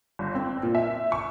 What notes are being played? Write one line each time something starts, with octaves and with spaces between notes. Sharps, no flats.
G1
C4
A#2
E5
C#6